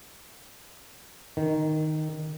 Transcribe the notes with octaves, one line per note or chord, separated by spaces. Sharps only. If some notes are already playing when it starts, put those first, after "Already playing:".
D#3